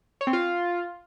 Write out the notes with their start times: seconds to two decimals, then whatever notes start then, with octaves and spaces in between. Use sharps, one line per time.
0.21 C#5
0.27 C4
0.33 F4